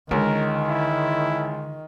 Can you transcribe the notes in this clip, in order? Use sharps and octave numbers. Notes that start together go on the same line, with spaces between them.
C#2 D3 D#3 A#4
E4